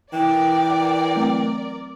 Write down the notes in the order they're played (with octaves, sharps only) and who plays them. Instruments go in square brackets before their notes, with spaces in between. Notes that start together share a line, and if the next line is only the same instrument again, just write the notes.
[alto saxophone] E3 [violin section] A#4 D5 [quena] G5
[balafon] F#3 A3 C4